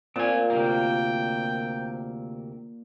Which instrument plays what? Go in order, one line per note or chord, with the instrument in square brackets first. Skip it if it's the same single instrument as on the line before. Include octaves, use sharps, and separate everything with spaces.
[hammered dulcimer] A#2 [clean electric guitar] C4 G#5
[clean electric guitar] D2 C3 A#3 [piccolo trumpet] G5